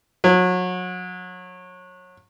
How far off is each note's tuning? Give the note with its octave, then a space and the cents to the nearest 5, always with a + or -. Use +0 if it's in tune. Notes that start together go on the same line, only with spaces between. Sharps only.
F#3 -30